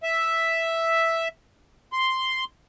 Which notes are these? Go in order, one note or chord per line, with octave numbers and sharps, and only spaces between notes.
E5
C6